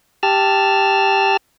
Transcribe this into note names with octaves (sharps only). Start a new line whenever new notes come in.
G4 A5 E6 F6